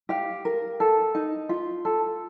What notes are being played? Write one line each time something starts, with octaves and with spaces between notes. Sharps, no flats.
G4 F5
A#4
A4
D#4
F4
A4